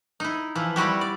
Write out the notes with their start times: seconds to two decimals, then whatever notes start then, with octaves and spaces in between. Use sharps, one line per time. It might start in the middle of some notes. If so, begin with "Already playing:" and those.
0.20 D#4 E4
0.55 E3 F3 E4
0.76 G3 C4 E4 F#4 G4
1.01 D5